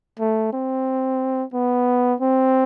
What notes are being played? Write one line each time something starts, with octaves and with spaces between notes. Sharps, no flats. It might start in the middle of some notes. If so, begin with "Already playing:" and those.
A3
C4
B3
C4